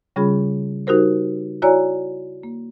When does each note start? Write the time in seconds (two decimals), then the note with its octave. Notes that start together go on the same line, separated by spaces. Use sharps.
0.16 C#3 G3 C#4 F4 G#4 B5
0.87 G3 D#4 F#4 G4 A#4 C5
1.62 E4 F#4 C#5 D5 G#5 A#5
2.43 A#3